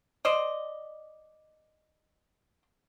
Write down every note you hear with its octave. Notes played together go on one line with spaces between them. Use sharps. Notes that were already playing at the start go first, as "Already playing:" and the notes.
C5 D5 D#5